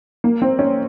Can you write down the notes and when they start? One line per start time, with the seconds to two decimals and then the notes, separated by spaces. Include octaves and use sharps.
0.24 A#3
0.42 C4
0.59 C#4